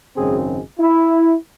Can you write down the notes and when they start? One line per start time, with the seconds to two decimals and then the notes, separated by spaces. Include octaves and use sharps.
0.16 G#1 F#2 C#3 G#3 C4 G#4
0.78 E4